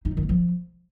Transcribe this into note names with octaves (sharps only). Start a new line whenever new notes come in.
D#4
C3
D#3
A#3
F3